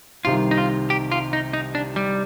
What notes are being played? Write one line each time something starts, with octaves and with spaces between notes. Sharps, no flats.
C2 C3 D#3 F4
D#4
F4
G4
F4
D#4
D#4
D4
G3